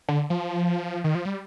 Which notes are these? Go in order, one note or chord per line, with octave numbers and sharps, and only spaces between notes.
D3
F3
D#3
F3
G3